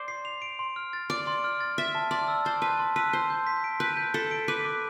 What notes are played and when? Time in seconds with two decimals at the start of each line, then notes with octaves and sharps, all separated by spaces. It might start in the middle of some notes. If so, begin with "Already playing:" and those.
Already playing: C5 D5
0.08 C7
0.25 F7
0.42 D7
0.59 C6
0.76 F6
0.93 A6
1.10 D5 D7
1.27 C6
1.44 F6
1.61 A6
1.78 E5 A6
1.95 A5
2.11 D5 C6
2.28 E6
2.45 C5 A6
2.62 B4 A5
2.79 C6
2.96 B4 E6
3.13 C5 G6
3.30 G6
3.47 B6
3.64 D7
3.80 B4 G6
3.97 G6
4.14 A4 B6
4.31 D7
4.48 B4 D6
4.65 D6